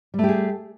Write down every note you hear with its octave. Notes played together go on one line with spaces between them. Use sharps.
G3 A3 G4 G#4